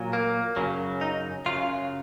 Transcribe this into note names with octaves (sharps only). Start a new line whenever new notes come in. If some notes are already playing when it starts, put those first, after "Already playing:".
Already playing: A#2 F#3
A#3
F#2 C#3 F#3
D#4
F#2 C#3 F#3 F4